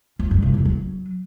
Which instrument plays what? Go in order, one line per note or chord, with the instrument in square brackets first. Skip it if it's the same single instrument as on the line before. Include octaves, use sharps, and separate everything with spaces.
[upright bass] F3
G2
C3
E2
F#3